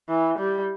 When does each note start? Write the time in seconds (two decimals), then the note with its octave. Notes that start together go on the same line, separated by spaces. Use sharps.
0.09 E3
0.39 G3